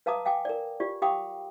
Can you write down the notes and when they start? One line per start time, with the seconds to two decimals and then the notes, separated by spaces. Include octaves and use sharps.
0.06 B4 F5 A5 A#5 D6 D#6
0.25 F5 G5 G#5 D6
0.45 A#4 D5
0.80 F4 G4 D5
1.02 G4 F5 G5 B5 D6 D#6